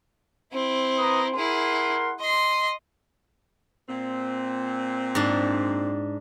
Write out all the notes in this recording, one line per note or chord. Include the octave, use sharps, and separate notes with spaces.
C4 E4
B4 A#5 D#6
E4 G#4 A#4 F#5 C6
D#5 C6 C7
A#2 C4
G#2 D4